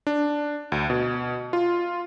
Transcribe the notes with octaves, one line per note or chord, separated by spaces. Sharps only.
D4
D2
B2
F4